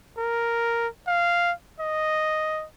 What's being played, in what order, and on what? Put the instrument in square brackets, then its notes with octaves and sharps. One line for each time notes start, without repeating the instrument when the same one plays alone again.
[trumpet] A#4
F5
D#5